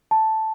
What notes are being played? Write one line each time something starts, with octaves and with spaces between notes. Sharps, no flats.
A5